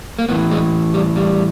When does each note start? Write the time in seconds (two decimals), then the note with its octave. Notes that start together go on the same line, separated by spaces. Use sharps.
0.19 A#3
0.29 A2 E3 B3
0.51 G#3
0.94 G3
1.16 G3